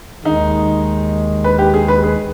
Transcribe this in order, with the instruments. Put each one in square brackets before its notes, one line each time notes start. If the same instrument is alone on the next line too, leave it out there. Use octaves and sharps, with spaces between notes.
[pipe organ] D#2 D#3 G#3 [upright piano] D#4
[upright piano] B4
G4
G#4
B4
G#4